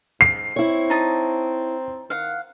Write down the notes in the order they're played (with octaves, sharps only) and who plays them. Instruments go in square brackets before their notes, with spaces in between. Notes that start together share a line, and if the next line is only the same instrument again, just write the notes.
[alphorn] G#2 [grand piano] C7
[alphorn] C4 [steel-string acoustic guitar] E4 C#5
[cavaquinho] D#4 A5 D#6
[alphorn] D#3 [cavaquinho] F5 F#5